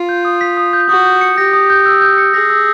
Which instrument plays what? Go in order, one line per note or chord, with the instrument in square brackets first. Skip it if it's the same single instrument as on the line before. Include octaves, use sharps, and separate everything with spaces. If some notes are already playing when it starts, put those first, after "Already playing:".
Already playing: [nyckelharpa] F4
[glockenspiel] G6
D#6
B6
D#6
G6
[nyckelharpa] F#4 [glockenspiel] D#6
[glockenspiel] G6
C#7
[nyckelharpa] G4 [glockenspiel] A#6
[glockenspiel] D#6
G6
E6
G6
C#7
[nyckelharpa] G#4 [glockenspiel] A#6
[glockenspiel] E6